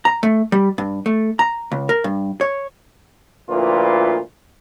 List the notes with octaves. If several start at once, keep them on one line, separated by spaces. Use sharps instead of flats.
A#5
A3
G3
G2
A3
A#5
C#2
A#4
G2
C#5
D2 A#2 F3 E4 F4 B4